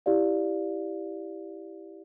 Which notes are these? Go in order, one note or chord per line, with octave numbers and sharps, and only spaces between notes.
E4 G4 D5 F5